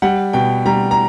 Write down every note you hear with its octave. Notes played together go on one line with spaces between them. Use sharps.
G3 F#5
B2 G5
G3 A#5
A#5